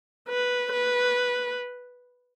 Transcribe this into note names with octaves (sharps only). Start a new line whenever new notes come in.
B4
B4